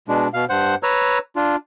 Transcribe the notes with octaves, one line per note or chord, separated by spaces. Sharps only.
B2 G#3 D4
B2 F5
G2 C5 F#5
B4 C#5 A#5 E6
D4 F4